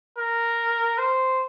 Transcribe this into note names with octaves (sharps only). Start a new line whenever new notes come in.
A#4
C5